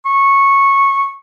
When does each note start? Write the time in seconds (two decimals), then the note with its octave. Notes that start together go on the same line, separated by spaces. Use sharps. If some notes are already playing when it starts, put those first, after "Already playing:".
0.06 C#6